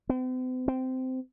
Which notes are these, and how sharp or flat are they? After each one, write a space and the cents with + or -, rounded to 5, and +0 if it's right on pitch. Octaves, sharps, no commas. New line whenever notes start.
C4 -45
C4 -15